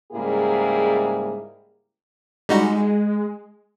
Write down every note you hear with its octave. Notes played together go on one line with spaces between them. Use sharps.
G#2 C#3 G3 A#3 E4 G#4
G3 G#3 D#4 F#4